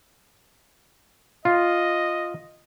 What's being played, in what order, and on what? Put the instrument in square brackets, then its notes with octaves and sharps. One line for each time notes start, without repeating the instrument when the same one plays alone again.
[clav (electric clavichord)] F4 [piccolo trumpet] D#5